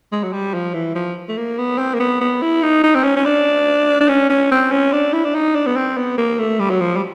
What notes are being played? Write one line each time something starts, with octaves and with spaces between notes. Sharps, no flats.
G#3
F#3
G3
F3
E3
F3
A3
A#3
B3
C4
A#3
B3
B3
E4
D#4
D#4
C4
C#4
C#4
D4
D4
C#4
C#4
C4
C#4
D4
E4
D4
D#4
D4
B3
C4
B3
A#3
A3
G3
F#3
F3
G3